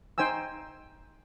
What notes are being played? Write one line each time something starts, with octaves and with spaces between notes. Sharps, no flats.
D#4 C5 G5 G#5 E6